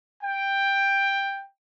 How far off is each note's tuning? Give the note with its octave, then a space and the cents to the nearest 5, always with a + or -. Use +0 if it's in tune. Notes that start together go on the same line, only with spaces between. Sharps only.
G5 +10